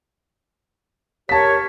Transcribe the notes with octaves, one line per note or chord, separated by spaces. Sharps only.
G4 A#4 C#5 A5 B6